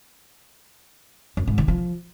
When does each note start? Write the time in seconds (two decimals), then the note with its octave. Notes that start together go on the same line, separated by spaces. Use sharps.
1.37 F#2
1.47 G#2
1.58 D#3
1.68 F3